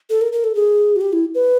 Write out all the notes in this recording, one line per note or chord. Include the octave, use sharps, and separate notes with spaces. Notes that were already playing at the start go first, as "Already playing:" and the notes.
A4
A#4
A#4
A4
G#4
F#4
G4
E4
B4